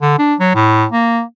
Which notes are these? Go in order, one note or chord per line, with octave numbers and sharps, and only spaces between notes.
D3
D4
F#3
A2
A#3